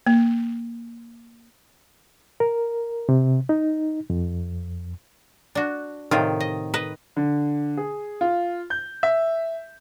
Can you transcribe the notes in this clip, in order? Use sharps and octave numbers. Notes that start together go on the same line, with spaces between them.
A#3
A#4
C3
D#4
F2
D4 F#4
A2 C3 D#3 F4
D#5
B4 D#5
D3
G#4
F4
G6
E5